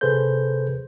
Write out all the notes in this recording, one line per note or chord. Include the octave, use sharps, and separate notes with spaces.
C3 G#4 A4 B4 C5 G6